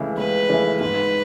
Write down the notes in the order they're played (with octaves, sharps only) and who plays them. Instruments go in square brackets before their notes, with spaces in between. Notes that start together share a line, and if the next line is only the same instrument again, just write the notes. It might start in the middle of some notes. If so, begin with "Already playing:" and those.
Already playing: [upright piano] C#2 C#3 E3 A3 E4
[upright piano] C#2 [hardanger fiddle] B4
[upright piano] C#3 E3 A3 E4
[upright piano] G#2 [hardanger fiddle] B4